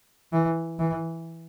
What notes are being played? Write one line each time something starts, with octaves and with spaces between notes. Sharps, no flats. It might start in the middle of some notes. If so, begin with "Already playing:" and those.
E3
E3